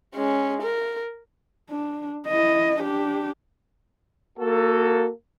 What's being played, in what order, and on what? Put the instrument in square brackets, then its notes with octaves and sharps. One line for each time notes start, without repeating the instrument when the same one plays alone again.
[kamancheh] G#3 C#4
A#4
[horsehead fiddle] D4
E4 D#5
D4 G4
[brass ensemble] A#3 F#4 A4